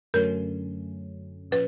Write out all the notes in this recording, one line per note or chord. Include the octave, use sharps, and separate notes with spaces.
F#2 D3 F#3 A3 C#4 A#4
A#2 F3 C#4 B4